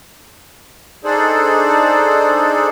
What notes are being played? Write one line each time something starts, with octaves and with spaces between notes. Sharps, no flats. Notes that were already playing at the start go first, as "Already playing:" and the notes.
D4 D#4 G#4 A4 C5 D5